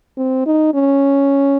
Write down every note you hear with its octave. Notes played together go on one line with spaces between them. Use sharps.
C4
D#4
C#4